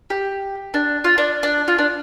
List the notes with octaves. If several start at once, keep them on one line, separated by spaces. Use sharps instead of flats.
G4
D4
F4
D4
D4
F4
D4